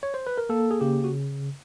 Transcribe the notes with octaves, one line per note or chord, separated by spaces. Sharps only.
C#5
C5
B4
A#4
A#3 A4
G#4
C#3 G4
F#4